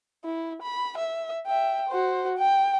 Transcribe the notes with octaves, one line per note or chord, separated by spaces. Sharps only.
E4
B5
E5
E5 G5
F#4 C5
G5